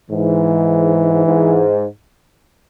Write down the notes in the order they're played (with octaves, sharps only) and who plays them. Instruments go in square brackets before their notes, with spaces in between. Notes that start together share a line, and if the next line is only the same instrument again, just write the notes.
[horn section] G#2 [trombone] E3
[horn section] G#2